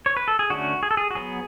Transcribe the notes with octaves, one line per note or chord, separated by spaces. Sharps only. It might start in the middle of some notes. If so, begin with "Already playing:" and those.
C#5
B4
A4
G#4
D3 A3 C#4 F#4
G#4
A4
G#4
F#4
F#3 B3 G#4